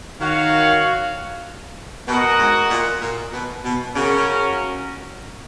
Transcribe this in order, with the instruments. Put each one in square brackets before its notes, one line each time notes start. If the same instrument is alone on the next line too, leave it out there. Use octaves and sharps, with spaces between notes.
[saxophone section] D#3 [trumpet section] F#4 C#5 F5
[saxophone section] B2 [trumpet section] F#4 A#4 D#5 F#5
[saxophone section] G#2
A#2
A#2
B2
B2
[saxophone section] C#3 [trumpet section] C#4 F#4 A#4